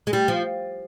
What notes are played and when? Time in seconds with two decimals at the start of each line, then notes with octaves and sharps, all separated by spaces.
0.07 G#3
0.13 G3
0.28 F3